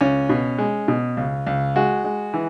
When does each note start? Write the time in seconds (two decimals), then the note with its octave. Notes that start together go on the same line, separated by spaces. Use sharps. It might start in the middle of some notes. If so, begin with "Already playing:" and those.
0.01 C#2 C#4
0.29 B2
0.58 G#3
0.88 B2
1.17 C#2
1.46 C#2
1.76 G#3 F#4
2.04 G#3
2.34 E3